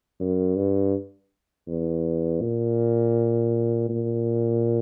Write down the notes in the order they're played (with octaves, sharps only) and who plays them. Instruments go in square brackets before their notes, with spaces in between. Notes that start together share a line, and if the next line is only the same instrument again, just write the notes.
[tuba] F#2
G2
E2
A#2
A#2